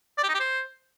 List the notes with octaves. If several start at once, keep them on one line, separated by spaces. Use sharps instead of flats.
D5
G4
D#4
G4
C5